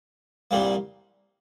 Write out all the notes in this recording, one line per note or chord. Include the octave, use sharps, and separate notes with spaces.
C2 A#2 G3 A#3